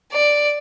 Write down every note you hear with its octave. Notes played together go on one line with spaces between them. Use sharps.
D5